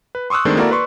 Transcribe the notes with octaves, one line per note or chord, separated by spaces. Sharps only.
B4
C6 C#6 D#6 E6 F#6
D#3 G#3 A3 C4 D4
A#3 E4 F#4 A4 A#4 D5
B4 D5 C6 C#6